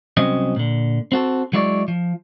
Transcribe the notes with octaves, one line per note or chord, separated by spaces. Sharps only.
C2 F#3 C4 C#4 D#5
A#2 D3
C4 F#4 A4
F#3 G#3 E4 C#5 D5
F3